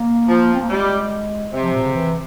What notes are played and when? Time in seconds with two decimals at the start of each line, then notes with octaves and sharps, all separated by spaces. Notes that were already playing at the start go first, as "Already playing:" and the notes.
Already playing: A#3
0.28 F3
0.54 C4
0.62 A#3
0.70 G3 G#3
1.53 C3
1.63 F3
1.73 A#2
1.83 C#3
1.94 E3